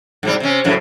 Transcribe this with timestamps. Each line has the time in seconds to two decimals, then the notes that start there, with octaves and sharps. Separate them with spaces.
0.23 G#2 C3 G3
0.40 C3 C#4
0.64 F#2 A2 C#3